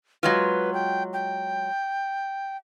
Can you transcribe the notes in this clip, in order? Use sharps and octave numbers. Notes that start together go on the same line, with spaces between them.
F#3 G#3 F4 B4
G5
G5